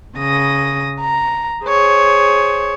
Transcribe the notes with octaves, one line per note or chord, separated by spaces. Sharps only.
C#3 D#6 A#6
A#5
G#4 C5 C#5